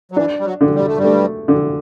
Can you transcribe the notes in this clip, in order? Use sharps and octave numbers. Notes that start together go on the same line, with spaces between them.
F#3
E3 D4
G3
F#3
D3
G3
A3
G2 G3
A3
D3